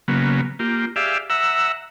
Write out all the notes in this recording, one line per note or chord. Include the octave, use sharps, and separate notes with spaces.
C#3 F#3 A#3 B3
A#3 F4 G4
G4 G#4 D5 E5 F5
E5 F#5 A#5 E6